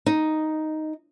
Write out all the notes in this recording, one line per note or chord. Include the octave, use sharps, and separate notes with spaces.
D#4